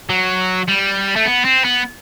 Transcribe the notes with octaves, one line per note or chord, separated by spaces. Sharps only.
F#3
G3
A3
B3
C4
B3